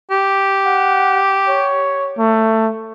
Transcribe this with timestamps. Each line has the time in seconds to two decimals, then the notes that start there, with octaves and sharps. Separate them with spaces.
0.11 G4
0.66 F#5
1.48 C#5
2.18 A3